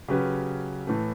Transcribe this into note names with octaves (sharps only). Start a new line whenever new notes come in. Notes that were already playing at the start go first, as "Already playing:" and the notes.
C#3 F#3 C#4 G4 B4
A2 E3 A3